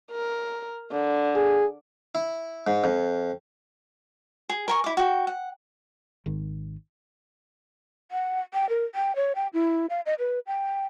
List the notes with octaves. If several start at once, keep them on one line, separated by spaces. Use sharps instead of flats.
A#4
D3
G#4
E4
G#2
F2
G#4
A#4 G#5 C#6
E4 D6
F#4 G5
F#5
G#1 D#3
F#5
G5
A#4
G5
C#5
G5
E4
F5
D#5
B4
G5